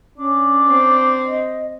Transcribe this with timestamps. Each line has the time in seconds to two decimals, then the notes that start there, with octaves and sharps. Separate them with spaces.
0.18 C#4 D4
0.67 C4
1.27 D#5